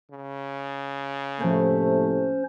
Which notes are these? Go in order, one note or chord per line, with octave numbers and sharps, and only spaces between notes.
C#3
A2 C3 F3 A3 A#3 C#4 C5